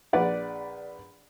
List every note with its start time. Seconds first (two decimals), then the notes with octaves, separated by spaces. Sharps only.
0.13 A#1 B4 D5 F#5